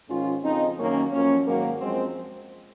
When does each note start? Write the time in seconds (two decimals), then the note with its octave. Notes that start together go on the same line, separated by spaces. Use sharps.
0.09 G#2 D#3 C#4 F4
0.43 F2 C#3 F3 C4 D#4
0.77 F#2 D#3 A#3 C#4
1.12 F#2 F3 A#3 C#4
1.46 G#2 D#3 F#3 A#3
1.80 F#2 F3 G#3 C4